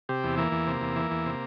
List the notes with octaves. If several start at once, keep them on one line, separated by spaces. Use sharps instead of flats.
C3 G4
E2
E3 A#3
E2
C3
E2
E3
E2
C3